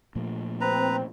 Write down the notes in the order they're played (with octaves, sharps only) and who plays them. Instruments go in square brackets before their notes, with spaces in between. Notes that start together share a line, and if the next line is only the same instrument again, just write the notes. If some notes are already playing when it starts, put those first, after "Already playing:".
[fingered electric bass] A#2 F3 A3
[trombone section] C4 [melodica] B4 A#5